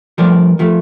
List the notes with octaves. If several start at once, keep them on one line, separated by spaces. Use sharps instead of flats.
G2 F3 A3 A#4 D5
F3 A3